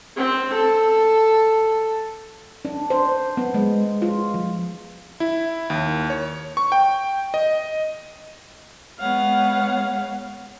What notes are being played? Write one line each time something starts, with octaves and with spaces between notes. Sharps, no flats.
C4
A4
D4
C5
B3
G#3
F4
F3
E4
D#2
C#5
C#6
G5
D#5
G#3 B3 C#5 F5 F#5 F6